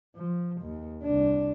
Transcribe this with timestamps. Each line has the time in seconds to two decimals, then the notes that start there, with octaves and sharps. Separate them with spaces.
0.16 F3
0.62 D#2
1.03 C2 D4